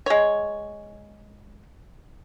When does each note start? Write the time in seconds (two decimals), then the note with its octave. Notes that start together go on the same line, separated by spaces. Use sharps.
0.06 G#3 C#5